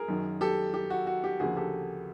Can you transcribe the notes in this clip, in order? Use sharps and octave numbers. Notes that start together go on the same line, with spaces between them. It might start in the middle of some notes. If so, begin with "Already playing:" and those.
Already playing: G#4 A#4
F#2 D#3 F#3
G4 A4
G4
F#4
F#4
G4
D2 C#3 F3 A#3 F#4 G#4
G4 A4